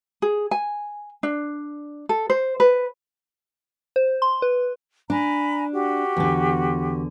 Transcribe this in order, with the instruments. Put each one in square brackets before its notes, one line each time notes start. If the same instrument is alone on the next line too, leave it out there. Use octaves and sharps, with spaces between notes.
[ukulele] G#4
G#5
D4
A4
C5
B4
[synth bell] C5
C6
B4
[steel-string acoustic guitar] D4 [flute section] G#5 A#5 B5
[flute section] F#4 G4
[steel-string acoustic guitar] E2 D3